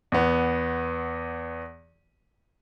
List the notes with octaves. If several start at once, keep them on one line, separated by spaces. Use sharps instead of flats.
E2 B3